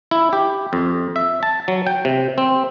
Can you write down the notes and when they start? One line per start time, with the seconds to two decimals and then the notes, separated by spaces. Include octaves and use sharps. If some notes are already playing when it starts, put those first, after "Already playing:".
0.11 E4
0.33 G4
0.73 F2
1.16 E5
1.43 A5
1.68 F#3
1.87 G5
2.05 C3
2.38 C4